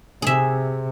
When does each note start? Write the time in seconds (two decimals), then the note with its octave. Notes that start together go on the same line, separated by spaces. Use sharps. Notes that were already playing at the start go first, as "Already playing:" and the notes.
0.22 C3 G#4 E5